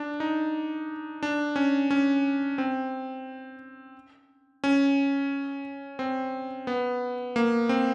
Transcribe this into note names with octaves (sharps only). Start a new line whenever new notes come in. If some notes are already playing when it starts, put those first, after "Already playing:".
Already playing: D4
D#4
D4
C#4
C#4
C4
C#4
C4
B3
A#3
C4